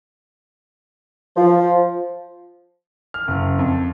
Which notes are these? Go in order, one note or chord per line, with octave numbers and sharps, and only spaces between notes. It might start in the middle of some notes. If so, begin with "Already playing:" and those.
F3
F6
F#1
F2